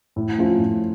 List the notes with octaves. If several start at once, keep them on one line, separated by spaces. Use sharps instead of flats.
A2
F3 A3 C#4 F4
A2